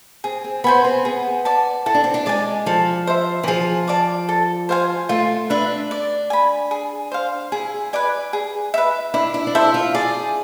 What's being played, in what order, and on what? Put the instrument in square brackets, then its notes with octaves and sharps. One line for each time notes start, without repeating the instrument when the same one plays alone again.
[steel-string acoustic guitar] C4 [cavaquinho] G#4
[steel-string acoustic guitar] C4
[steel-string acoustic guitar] B3 [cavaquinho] C5 G#5 B5
[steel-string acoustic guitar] C4
[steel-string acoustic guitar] B3 [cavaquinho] G#4
[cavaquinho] D5 A5
[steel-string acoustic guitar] E4 [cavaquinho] A4
[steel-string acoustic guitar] D4
C4
D4
[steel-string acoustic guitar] G#3 [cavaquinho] D5 G#5
[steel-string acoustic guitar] F3 [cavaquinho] A4
[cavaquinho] C5 E5
[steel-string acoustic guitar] E3
[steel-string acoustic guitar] F3 [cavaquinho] G#4
[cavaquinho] D5 A5 D6
A4
C5 F5 G#5
[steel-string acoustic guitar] A3 [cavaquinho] F4
[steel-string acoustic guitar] D4 [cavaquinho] B4 E5
[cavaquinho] D5
G#5 B5
G#4
C5 F5
[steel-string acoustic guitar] E4 [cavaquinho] G#4
[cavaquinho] B4 D5 G#5
G#4
B4 E5
[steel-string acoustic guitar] D4 [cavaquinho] E4
[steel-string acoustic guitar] E4
D4
[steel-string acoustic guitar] E4 [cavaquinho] A4 C5 E5
[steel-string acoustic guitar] F4
[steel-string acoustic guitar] G#4 [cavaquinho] D5